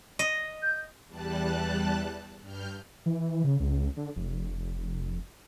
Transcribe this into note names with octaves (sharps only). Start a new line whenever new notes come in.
D#5
G6
E2 G3 A5 F#6
G2 F6 G6
E3
C#3
C#2
D3
F1